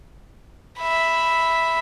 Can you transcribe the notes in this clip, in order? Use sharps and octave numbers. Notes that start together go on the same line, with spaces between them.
E5 B5